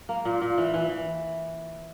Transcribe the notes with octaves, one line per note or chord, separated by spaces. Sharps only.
A#3
A#2
A#2
E3
E3
E3